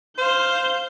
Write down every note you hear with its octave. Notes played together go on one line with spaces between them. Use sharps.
C5 F5 G6